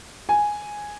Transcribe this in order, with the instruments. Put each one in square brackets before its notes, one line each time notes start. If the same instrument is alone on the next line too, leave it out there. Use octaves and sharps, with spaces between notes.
[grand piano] G#5